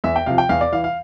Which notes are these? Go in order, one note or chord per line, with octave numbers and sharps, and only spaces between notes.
E2 E5
G5
C3 F3 F5
G5
E2 F5
D5
E3 F5
F5